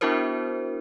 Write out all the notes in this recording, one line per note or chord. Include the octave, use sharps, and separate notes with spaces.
B3 D4 E4 F#4 A#4 C5